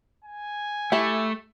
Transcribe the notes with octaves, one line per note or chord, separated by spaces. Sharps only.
G#5
A3 E4 G4